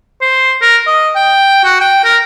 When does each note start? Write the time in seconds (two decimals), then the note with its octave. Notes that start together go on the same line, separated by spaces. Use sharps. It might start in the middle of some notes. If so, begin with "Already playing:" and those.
0.21 C5
0.62 A#4
0.87 D#5
1.16 G5
1.64 F#4
1.81 G5
2.05 A#4